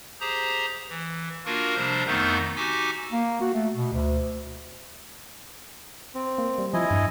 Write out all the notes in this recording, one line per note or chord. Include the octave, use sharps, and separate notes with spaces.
G4 G#4 C5 A#5
E3
A#3 D4 F4 F#4 A#4
C3 F3 G3 D4 C5 G6
F2 D#3 A3 B3 D#4 G6
D#4 F#4 G4 G#5 D6 E6
A#3
F#4
A3
B2
D2
C4
A#3
G3
F3 E4 D#5 G#5
G2